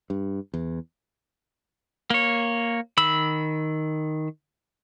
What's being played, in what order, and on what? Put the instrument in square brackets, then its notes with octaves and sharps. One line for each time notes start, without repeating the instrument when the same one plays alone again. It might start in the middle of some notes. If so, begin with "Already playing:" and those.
[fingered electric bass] G2
E2
[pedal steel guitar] A#3 C#5
D#3 B5 E6